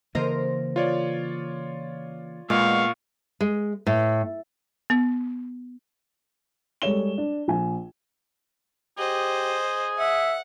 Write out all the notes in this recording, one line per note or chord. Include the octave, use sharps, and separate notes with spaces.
C#3 E3 A#3 A#4 C5 D#5
F4 C#5 D5
A#2 G#3 B3 F5 C#6
G#3
A2
B3
G3 G#3 A4 C#5 E7 G7
D4
A#1 G#5
G4 G#4 C5 D#5
E5 F#5